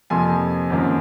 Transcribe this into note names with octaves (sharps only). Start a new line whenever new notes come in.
F2 C3 F3 A#3 G#5 C6
G#1 F#2 F3 A#3